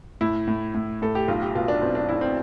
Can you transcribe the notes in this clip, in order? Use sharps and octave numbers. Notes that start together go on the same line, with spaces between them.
A2 E4
A2
A2
A2 A4
G4
B1 F4
G4
B2 F4
D4
B2 C4
D4
B1 E4
C4